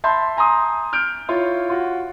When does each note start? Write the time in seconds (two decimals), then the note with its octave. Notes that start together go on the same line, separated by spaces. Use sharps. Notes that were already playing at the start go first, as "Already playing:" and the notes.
0.04 E5 A5 B5 C6 G6
0.37 G#5 A#5 C6 D#6
0.93 F6 G6 D7
1.28 E4 F4 C#5
1.70 F4 F#4